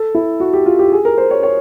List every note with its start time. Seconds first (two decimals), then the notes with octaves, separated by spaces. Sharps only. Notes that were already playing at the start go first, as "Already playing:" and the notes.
Already playing: A4
0.15 E4
0.40 F#4
0.53 G4
0.66 F4
0.79 G4
0.92 G#4
1.05 A#4
1.18 C5
1.31 C#5
1.43 C#5